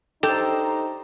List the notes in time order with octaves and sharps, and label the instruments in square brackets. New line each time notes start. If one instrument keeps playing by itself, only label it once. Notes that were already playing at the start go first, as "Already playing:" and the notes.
[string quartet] D4 C5 A#5 [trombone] D#4 [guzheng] G4 [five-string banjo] A4